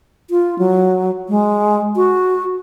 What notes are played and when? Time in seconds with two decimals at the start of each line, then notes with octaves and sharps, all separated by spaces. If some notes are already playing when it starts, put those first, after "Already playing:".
0.30 F4
0.59 F#3
1.29 G#3
1.96 F#4